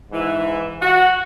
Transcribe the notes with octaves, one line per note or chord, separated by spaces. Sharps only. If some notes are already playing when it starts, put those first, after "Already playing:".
G#2 E3
F#4